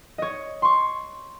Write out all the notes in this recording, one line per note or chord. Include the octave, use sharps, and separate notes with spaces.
C#5 D#5
C6 C#6